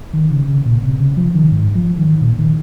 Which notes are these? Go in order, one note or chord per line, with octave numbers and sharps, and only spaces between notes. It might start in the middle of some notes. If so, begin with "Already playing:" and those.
D#3
C#3
C#3
A#2
C3
C#3
F3
D#3
G#2
F3
D#3
A#2
D#3